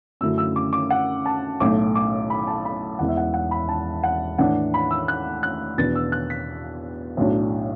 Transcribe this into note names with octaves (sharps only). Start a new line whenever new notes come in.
F#2 D3 F#3 A3 E4 E6
E6
D6
D6
F#5
A5
B1 A2 A3 D6
D6
B5
A5
B5
E1 E2 E3 F#5
E5
F#5
F#5
B5
A5
F#5
A2 E3 D4 F#5
B5
E6
F#6
F#6
E2 B2 B3 D4 A6
E6
F#6
B6
B1 A2 F#3 D4